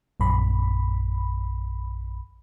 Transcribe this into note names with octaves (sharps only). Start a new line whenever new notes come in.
A#1 F#2 B5